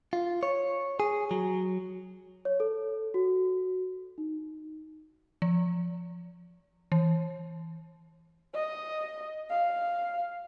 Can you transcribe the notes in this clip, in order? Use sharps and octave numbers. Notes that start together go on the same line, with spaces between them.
F4
C#5
G#4
F#3
C#5
A4
F#4
D#4
F3
E3
D#5
F5